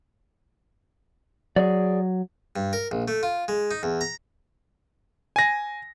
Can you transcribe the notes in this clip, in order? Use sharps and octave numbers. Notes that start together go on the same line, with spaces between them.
F#3 G#4 D5
G2
A#4
A#1
A3
F4
G#3
D#4
E2
A#5
G#5 A#6